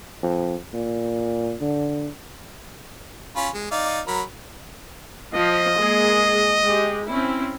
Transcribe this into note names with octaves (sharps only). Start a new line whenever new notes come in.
F2
A#2
D3
C#4 F4 B5
G#3
D#4 D5 F5
F#3 A#4 B5
F3 D#5
G#3 A#3 G#4
G#3 G4
C4 C#4 E4